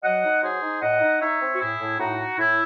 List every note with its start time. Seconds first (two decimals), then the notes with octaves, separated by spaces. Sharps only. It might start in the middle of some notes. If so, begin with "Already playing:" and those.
0.03 F#3 D#5 F#5
0.23 D#4
0.42 F#3 G#4 C5
0.62 D#4
0.81 A2 D#5 F#5
1.01 D#4
1.20 D#4 C#5 E5
1.41 C4
1.53 F#4
1.60 A2 E4 G#4
1.79 A2
1.99 A2 D#4 F#4
2.18 D#4
2.38 A2 E4